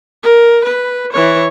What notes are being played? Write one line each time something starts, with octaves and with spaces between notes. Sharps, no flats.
A#4
B4
E3 C#5